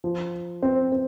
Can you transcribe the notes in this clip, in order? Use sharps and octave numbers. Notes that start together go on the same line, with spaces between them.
F3
C4
C4